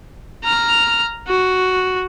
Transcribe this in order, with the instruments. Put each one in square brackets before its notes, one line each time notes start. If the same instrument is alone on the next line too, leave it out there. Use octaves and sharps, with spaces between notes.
[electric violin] A#5 F6
F#4